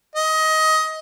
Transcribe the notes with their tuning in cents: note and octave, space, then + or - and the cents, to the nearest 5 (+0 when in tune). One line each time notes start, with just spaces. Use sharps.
D#5 +20